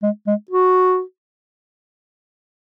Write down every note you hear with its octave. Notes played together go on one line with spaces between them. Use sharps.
G#3
G#3
F#4